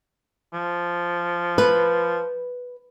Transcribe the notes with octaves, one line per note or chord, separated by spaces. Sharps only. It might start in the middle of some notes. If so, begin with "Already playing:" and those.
F3
B4